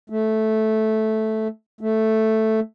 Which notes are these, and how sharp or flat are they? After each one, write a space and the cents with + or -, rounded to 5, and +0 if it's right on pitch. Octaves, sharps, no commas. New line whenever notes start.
A3 -10
A3 +0